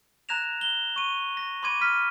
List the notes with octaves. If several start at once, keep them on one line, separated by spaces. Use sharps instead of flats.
A#5 F#6 G#6 A#6 E7 F7
G7
C#6 D#7
A#6
B5 C6 D6 G#6 D#7
F6 B6 D#7